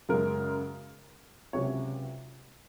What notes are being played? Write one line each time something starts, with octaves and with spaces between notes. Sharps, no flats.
F#2 C#3 G#3 A#4
C#2 C3 F#3 C#4 C#5